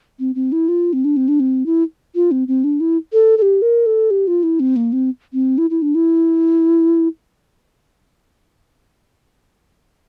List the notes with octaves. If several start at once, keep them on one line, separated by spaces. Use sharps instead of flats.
C4
C4
E4
F4
C4
D4
C4
D4
C4
E4
F4
C4
C4
D4
E4
A4
A4
G4
A#4
A4
G4
F4
E4
C4
A#3
C4
C4
E4
E4
D4
E4